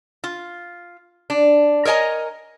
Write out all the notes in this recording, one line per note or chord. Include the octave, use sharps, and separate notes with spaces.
F4
D4
A#4 C#5 D#5 G#5 A#5